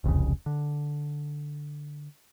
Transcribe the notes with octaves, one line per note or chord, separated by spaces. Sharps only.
E1 C2 F2 C#3
D3